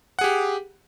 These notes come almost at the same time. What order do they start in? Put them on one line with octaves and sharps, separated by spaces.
F#5 G#4 G4